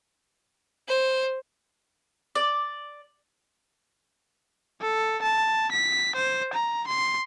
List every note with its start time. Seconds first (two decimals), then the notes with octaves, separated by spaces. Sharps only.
0.88 C5
2.35 D5
4.82 A4
5.22 A5
5.72 B6
6.16 C5
6.54 A#5
6.88 C6